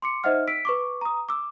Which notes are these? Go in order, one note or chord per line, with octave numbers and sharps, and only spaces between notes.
C6 D6 C#7
D#4 C5 D#5 E5 F#5 F6
E6 B6 D7
B4 C#6 D6
A#5 D#6
D6 E6